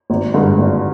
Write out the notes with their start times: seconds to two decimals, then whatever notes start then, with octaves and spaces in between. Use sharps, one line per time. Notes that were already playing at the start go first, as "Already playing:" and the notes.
0.10 G#1
0.34 G2 D3 G#3
0.58 G#1